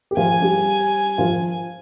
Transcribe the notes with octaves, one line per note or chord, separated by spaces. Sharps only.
G4
F3 F4 G#5
G3 G4
F3 F4